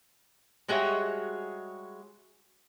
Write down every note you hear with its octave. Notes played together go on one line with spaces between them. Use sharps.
G3 G#3 F#4 G#4 C#5 E5